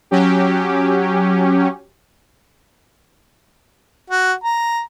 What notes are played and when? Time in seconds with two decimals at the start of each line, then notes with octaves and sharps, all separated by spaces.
0.11 F#3 C#4 G4
4.10 F#4
4.44 A#5